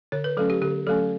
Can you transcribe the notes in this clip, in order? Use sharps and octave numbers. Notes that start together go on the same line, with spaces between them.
D3 C#5
B4
F#3 A3 C#4 A4
G4
D3 G4
F#3 A3 C#4 A4